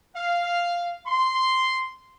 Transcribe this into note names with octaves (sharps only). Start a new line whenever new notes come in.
F5
C6